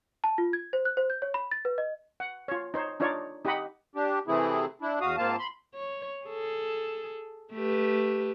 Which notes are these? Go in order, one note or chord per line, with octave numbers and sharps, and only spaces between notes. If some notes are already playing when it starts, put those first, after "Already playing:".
A5
F4
G#6
C5
F#6
C5
G6
C#5
B5
A6
B4
D#5
F#5
F4 C#5
D#4 C5 C#5
D4 D#4 F4 C#5 D5
D#4 G4 D#5 F#5 B5
D4 G4
C3 E3 A3 C4 E4 G#4
D4 E4
E2 F#4 F5 D#6
G#2 A#3 C4 F4 F5 A5
B5 C6
C#5
G#4 A4
A3 G4 B4